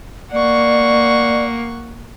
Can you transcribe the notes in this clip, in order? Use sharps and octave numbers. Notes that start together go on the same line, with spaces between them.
A#3 D5 F#5 C#6